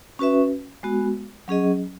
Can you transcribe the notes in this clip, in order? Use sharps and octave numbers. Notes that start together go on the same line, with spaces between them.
C#4 F#4 B4 E5
G#3 B3 F#4
F#3 C#4 G#4 D#5